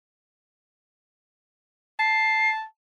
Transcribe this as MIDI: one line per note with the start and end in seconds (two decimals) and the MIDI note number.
1.99 2.63 81
1.99 2.50 96